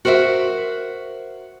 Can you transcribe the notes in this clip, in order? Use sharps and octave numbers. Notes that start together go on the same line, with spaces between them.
F#4 A#4 C5 D#5 E5